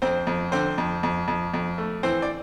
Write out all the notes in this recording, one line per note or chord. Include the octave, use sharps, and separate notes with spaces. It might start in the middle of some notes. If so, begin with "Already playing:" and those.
F2 C4 C5
F2
D3 C4 C5
F2
F2
F2
F2
A3
E3 C4 C5
D5